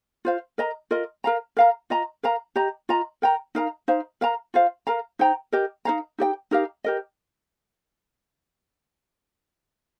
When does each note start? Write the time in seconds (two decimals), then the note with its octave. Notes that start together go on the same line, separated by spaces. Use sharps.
0.25 F4 C5 F5
0.58 A#4 D#5 A#5
0.91 F4 A#4 D#5
1.24 A#4 F5 A#5
1.57 A#4 F5 A#5
1.90 F4 D#5 A#5
2.23 A#4 F5 A#5
2.56 G4 D#5 A#5
2.89 F4 D#5 A#5
3.22 A#4 G5 A#5
3.55 D#4 A#4 F5 A#5
3.88 D#4 C5 F5
4.21 A#4 F5 A#5
4.54 F4 C5 F5
4.87 A#4 F5 A#5
5.19 D#4 C5 G5 A#5
5.52 G4 A#4 D#5
5.85 D#4 C5 F5 A#5
6.18 D#4 G4 D#5 G5
6.51 D#4 G4 A#4 F5
6.84 G4 A#4 D#5